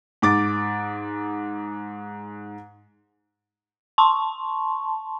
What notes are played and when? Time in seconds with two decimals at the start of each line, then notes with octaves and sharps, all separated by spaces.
0.22 G#2 D6 A6
3.98 A5 C6 C#6